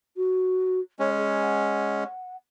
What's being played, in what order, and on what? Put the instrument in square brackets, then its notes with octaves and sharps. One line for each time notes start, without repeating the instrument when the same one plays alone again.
[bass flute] F#4
[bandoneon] G#3 C#4 [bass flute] C#5
[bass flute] G#4
F#5